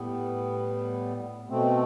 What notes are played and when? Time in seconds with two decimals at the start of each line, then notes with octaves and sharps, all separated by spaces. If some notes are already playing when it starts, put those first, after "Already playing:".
Already playing: A2 G3 B3
1.49 B2 A3 C4